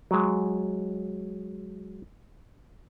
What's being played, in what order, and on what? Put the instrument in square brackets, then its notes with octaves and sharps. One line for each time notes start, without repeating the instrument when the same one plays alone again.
[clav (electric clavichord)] F#3 G#3